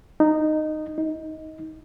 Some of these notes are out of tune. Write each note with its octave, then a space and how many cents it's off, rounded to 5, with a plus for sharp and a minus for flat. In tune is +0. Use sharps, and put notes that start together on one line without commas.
D#4 -10
D#4 +20